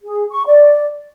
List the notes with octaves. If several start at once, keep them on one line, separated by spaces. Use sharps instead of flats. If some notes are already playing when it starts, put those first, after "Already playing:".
G#4
C#6
D5